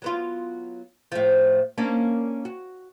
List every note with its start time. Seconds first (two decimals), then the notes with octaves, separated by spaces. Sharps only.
0.02 F#3 B3 F4
1.12 A2 F3
1.78 A#3 C#4 D4
2.45 F#4